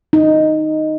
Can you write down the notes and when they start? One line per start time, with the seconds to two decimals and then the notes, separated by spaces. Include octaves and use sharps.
0.13 D#4